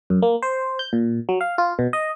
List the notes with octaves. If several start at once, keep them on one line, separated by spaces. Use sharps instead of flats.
F#2
A#3
C5
G6
A#2
F#3
F5
F4
B2
D#5